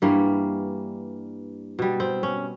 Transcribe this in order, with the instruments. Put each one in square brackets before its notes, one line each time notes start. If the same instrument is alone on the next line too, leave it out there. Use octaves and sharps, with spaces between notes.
[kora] G2 E3 G3 A#3
B2 G3
C4
C#4